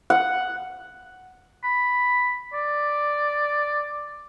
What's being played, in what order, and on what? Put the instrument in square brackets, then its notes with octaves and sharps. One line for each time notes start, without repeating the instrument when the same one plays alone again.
[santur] F#5
[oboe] B5
D5